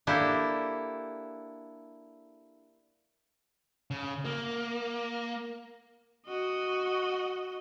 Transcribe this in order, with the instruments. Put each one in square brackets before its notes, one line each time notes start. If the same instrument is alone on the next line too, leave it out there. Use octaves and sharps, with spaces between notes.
[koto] A#3 D4 E4 G4 A4
[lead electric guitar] C#3
A#3
[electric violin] F#4 D#5